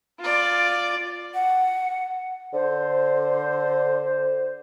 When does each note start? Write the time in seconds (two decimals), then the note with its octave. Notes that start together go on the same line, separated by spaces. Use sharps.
0.20 F4 D5
1.34 F#5
2.53 D3 C5